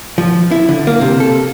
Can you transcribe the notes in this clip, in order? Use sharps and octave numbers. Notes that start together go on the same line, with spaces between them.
F3
E4
D3
A#3
C3
A4